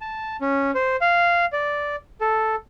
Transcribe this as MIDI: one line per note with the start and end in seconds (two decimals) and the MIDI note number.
0.01 0.37 81
0.41 0.71 61
0.75 0.96 72
1.01 1.45 77
1.53 1.96 74
2.21 2.55 69